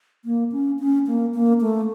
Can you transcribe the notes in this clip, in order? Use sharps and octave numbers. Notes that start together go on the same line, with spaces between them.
A#3
C#4
C#4
A#3
A#3
A3